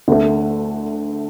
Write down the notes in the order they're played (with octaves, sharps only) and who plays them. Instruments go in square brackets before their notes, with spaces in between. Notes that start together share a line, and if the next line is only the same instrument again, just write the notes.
[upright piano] D2 D3 A3